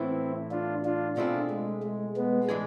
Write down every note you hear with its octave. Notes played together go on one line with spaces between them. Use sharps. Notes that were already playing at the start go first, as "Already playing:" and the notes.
Already playing: A2 E3 B3 C4 E4
D4 F4
D4 F4
B2 A3 C4 D4 E4 F4 G#4
G#3
G#3
G#3 B3
A2 E3 G#3 D4 G#4